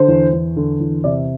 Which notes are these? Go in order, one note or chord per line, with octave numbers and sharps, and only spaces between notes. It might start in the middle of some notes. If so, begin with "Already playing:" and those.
Already playing: D3 C5
E2
E2
D3
E2
C3 D5